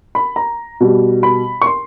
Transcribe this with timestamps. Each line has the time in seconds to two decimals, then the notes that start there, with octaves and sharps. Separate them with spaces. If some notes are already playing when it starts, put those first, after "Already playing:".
0.15 B5
0.36 A#5
0.80 B2 G3
1.23 B5
1.61 C#6
1.66 C6